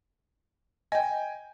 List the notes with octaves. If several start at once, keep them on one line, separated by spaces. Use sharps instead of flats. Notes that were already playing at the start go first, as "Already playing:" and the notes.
D#5 G5 G#5